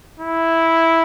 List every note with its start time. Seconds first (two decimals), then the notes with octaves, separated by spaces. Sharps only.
0.20 E4